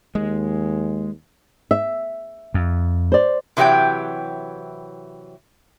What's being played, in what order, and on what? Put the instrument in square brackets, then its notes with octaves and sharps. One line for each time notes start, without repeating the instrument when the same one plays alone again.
[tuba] D#2 [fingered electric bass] G#3
[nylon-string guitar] E5
[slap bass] F2
[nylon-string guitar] C5 D5
[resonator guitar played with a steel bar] C3 E3 F#3 G4 C#5 G5